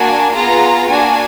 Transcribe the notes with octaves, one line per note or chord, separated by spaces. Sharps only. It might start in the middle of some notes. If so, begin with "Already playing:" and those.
Already playing: A#3 D4 F#4 G#5
B3 F4 G#4 A#5
A#3 D4 F#4 G#5